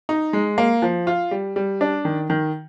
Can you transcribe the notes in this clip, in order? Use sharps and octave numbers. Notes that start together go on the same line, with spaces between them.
D#4
G#3
A#3
F3
F4
G3
G3
D4
D#3
D#3